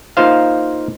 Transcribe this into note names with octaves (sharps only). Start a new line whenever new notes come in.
A#3 D#4 F4 C5 F5